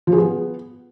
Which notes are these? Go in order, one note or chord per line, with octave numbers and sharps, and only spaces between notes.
F3
G#4
B3